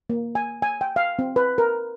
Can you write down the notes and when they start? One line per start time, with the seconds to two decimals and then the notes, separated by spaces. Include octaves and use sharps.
0.10 A#3
0.35 G#5
0.62 G#5
0.81 G5
0.96 F5
1.19 C4
1.36 B4
1.58 A#4